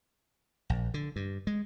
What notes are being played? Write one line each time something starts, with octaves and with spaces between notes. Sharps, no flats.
A#1
D3
G2
G#3